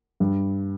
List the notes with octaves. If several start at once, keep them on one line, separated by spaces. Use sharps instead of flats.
G2